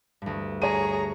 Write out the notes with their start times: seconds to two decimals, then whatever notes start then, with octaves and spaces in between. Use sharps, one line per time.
0.22 D2 G2
0.62 G#4 C#5 A#5 D#7